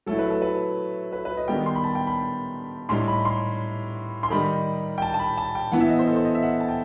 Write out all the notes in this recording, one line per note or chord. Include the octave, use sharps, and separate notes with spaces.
F#3 A3 E4 A4
B4
A4
B4
B4
B4
D#5
D#3 G3 B3 G5
C6
B5
A5
G5
B5
A2 G3 D#4 C6
B5
C6
C6
D#3 G3 D#4 B5
G5
A5
A5
B5
A5
G5
E3 B3 E4 F#5
E5
D#5
C5
A4
C5
D#5
E5
F#5
A5
G5